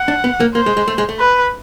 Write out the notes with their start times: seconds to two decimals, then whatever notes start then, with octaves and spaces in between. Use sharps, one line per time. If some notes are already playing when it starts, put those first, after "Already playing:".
Already playing: F#5
0.08 D4
0.24 B3
0.40 A#3
0.55 A#3 C5
0.66 G#3
0.77 G#3
0.88 A3
0.98 G#3
1.09 A3
1.19 B4